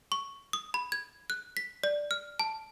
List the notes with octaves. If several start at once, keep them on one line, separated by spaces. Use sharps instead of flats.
C#6
D#6
B5
G#6
F#6
B6
D5
F6
A5